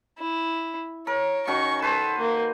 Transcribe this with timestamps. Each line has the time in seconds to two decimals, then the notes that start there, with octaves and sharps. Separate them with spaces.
0.19 E4
1.07 A#4 C#5
1.47 D#3 C#4 F#4 C#6
1.82 A4 B4 C5
2.19 A#3